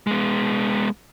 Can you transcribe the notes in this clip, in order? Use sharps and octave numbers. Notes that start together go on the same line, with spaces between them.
G#3 B3